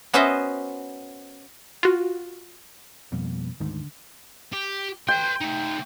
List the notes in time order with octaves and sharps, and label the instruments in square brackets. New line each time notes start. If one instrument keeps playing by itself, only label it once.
[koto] B3 C#4 F#4 C5 D#5 E5
[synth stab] F4 F#4
[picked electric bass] F2 [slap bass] B2 G3 A#3
[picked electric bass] D2 G#2 D#3 [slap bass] D3
[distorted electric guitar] G4
[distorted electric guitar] B4 C6 [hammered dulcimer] G5
[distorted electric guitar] A3 D#4